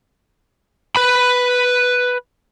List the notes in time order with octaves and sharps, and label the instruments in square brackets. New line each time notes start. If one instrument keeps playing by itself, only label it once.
[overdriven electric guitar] B4 B5